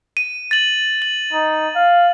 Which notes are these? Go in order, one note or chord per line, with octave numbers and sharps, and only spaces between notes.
D#7
A6 F#7
F#7
D#4
F5